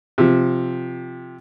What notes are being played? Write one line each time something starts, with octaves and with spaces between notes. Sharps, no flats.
C3 F3